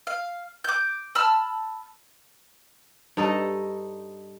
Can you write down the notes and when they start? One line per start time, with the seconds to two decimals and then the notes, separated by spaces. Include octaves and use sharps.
0.07 F5
0.64 D6 G6
1.15 A5 B5 E6 F6
3.17 G2 D#4 A4 D#5